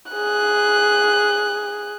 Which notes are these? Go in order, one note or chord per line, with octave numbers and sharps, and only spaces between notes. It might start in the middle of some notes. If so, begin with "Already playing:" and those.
G#4 F#6